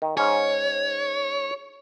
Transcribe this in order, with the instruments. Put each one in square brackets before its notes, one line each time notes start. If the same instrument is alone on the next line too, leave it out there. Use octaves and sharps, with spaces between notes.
[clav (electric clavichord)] D#3
[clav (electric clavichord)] G#2 C#4 [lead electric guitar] C#5